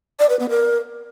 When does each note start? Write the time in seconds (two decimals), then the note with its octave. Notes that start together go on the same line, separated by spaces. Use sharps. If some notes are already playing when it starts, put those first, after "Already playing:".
0.19 D5
0.29 B4
0.39 B3
0.50 A#4